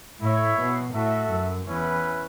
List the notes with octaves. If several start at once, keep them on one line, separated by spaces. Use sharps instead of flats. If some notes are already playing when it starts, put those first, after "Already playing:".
A2 E4 C#5 E5
B2
A2 F#4 A4 E5
F#2
E2 C#4 E4 B4